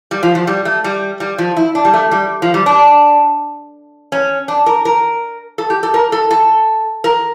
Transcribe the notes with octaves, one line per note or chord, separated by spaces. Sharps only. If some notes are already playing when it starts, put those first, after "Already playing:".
G3
F3
F3
G3
A3
G3
G3
F3
E4
D4
G3
A3
G3
F3
G3
D4
C#4
D4
A#4
A#4
A4
G4
A4
A#4
A4
A4
A#4